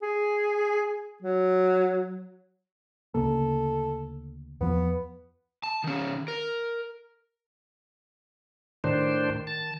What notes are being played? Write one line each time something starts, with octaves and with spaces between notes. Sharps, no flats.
G#4
F#3
D2 C#3 A#3 A4
E2 F3 B3
A5
D#3 C#4
A#4
A2 D#3 D4 C5
A5